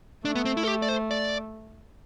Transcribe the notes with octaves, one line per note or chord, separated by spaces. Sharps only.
A3 D4
B3
C4
E4
A4
G4
D5
C5
D5